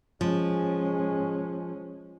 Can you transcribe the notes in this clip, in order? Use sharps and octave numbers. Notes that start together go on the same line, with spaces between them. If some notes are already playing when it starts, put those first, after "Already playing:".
F3 G#3 C#4